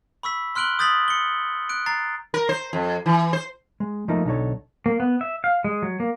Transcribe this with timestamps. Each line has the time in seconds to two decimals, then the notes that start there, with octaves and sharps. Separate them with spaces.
0.23 B5 C#6 E6 B6
0.55 C6 F6 F#6 D7 F#7 G7
0.79 D#6 G6 A6 B6 F#7
1.08 C#7 G7
1.69 F#6 D7
1.86 A#5 A6 C7
2.34 A#4
2.49 C5
2.73 F2
3.06 E3
3.33 C5
3.80 G#3
4.08 F3 A3 A#3 D#4
4.25 B1 D3 D#4 A4 C#5
4.86 A#3
5.00 B3
5.21 E5
5.44 F5
5.64 G#3
5.82 F#3
6.00 A#3